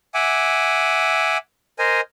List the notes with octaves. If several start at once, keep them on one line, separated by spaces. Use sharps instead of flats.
E5 F#5 G#5 D6
A#4 C5 D#5 G#5